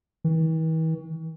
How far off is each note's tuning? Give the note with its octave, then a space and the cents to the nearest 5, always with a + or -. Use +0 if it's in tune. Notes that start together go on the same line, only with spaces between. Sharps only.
E3 -45